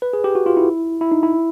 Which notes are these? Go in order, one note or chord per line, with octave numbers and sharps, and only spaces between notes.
B4
G#4
G4
F#4
F4
E4
E4
D#4
E4